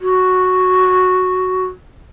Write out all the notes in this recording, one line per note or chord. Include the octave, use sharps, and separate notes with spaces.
F#4